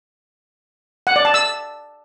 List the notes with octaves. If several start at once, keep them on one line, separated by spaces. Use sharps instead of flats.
F#5
D5
A5
E6